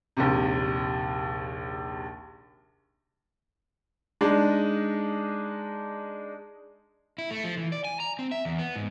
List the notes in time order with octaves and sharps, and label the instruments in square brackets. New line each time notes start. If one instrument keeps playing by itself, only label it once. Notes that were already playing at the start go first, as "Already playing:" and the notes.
[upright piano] A#1 D#2 C3
G#3 D4 D#4
[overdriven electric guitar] E4
A3
F3
E3
D5
G#5
A#5
C4
E5
E2
B3
G#2